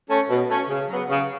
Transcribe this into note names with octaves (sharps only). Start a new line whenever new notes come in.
A3 C#4
B2
A3 C#4
C#3
F#3 B3
C#3